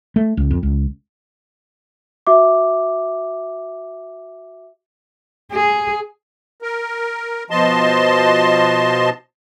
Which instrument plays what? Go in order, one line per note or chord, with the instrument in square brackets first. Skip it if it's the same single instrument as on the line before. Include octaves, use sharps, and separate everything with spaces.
[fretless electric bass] A3
C#2
F2
C#2
[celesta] F#4 E5 D6
[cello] G#4
[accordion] A#4
B2 F3 D#5 A5 C6